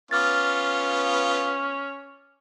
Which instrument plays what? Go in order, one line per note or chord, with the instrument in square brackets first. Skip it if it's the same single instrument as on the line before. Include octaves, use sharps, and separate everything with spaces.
[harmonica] B3 F4 [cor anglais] C#4 [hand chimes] D6 F6 A6